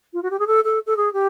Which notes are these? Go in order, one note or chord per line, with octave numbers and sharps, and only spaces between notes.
F4
F#4
G4
G#4
A4
A4
A4
G#4
G4